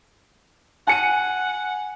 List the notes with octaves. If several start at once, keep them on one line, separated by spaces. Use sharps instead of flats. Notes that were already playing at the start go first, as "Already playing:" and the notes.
F#5 G#5 C#7 D#7